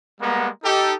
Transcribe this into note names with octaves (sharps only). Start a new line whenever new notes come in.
G3 G#3 A#3 B3 F#5 A#5
D#4 G4 A4